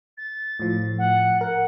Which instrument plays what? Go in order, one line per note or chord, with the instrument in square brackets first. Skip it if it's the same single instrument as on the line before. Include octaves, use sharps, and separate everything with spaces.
[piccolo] A6
[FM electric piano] A2 F3
[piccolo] F#5
[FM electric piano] A#4 [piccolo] F#5